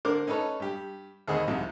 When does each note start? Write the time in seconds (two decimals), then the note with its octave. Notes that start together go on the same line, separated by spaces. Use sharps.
0.05 D3 A#4 C5 D6
0.27 C#4 D#4 A4 B4 C#5
0.60 G2 G4
1.28 D#2 C4 G#4 D#5 F#5 B5
1.47 C2 G#2 C3 F3